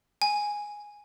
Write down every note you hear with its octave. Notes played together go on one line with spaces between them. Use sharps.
G#5